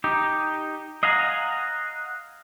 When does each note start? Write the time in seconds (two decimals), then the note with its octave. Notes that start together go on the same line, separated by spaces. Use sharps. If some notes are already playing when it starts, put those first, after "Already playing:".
0.04 D#4 G4
1.03 D#5 F5 F#5 G#5 A#5